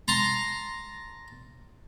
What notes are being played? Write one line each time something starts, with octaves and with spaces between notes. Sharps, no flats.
A5 A#5 C6